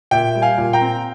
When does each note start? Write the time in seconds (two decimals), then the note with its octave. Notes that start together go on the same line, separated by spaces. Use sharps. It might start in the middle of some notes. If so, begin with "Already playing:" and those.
0.11 A#2 E5 G5
0.35 G3
0.42 F5 G#5
0.58 A#2
0.73 G5 A#5
0.81 C4